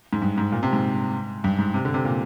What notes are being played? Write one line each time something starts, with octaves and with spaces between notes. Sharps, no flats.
G#2
G2
G#2
A#2
C3
G#2
G2
G#2
C3
D3
C3
A#2